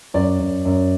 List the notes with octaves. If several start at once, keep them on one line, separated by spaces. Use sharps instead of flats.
F#2 D5
F#2
F#2